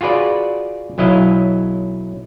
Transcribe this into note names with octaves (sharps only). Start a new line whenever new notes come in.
F4 F#4 G#4 B4 D5
B1 F#3 E4 D#5 F5